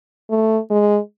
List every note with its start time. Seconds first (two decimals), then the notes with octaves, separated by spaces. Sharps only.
0.30 A3
0.70 G#3